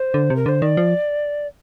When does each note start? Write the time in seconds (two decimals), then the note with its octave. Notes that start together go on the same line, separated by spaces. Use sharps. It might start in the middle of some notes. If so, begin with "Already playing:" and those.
Already playing: C5
0.14 D3
0.30 C3
0.36 A#4
0.46 D3 C5
0.62 D#3 D5
0.77 F3